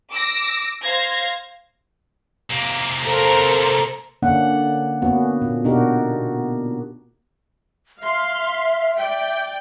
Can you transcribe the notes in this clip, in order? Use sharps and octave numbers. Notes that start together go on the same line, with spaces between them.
D6 E6 A#6
C5 F5 G#6 A#6
C3 A#3
A4 A#4 C5
D3 A#3 C#4 D4 F#5
A#3 B3 C#4 F#4
A#2
B2 D4 D#4 F#4 G4 A#4
E5 F5 C6
D5 G5